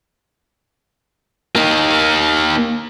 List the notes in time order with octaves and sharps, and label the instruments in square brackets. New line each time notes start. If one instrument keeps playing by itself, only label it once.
[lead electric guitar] A#3 D#4